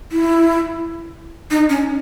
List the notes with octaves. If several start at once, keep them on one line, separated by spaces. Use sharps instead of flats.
E4
D#4
C#4